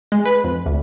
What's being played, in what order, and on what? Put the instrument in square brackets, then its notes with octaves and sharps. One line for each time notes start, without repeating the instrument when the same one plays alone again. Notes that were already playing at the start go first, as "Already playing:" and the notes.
[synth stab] G#3
B4
F2
D2